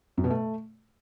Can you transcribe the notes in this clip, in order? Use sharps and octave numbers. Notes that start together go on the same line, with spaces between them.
F#2
B2
A3